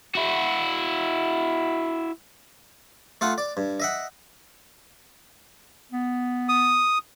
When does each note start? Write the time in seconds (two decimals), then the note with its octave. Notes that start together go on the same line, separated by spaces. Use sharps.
0.15 E4 F#4
3.21 A3 F4 F#5 D#6
3.38 D5
3.57 G2
3.80 D#5 E5 F#5
5.92 B3
6.49 D#6